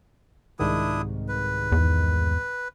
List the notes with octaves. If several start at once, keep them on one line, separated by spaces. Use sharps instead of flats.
C2 G#2 D#3 D4 E4 D#6
B4
E2